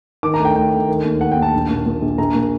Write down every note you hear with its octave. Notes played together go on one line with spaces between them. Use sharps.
D#3 D6
A#5
D2
G5
D2 G5
D2
D#3
D#2
D#3 F#5
G5
D#2
A5
A#1
A#2
A#2
A#1
A#1 A#5
A#2